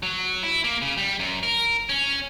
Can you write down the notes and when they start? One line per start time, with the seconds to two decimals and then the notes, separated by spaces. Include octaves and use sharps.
0.03 F#3
0.43 E4
0.64 A#3
0.82 C#3
0.97 G3
1.19 F#2
1.43 A#4
1.89 C#4